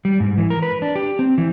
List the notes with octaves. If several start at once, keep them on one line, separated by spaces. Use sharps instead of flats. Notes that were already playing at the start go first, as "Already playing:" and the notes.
G3
G#2
E3
A#4
B4
D4
G4
C4
E3